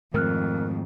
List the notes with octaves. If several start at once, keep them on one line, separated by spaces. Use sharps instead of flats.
F2 G#2 D#3 A3 A#4 F6 F#6